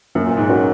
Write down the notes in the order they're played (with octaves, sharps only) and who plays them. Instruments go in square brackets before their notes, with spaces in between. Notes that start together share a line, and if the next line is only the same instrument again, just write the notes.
[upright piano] F#2 [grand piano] A#3
[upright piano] A#2
G#2
[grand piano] C#4 F#4 A#4